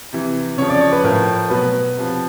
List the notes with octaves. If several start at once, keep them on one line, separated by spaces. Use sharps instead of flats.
C3 E3
C#3 F3 C#5
D5
C#5
B4
A2 F3 A#4
B2 F#3 B4
C3 F3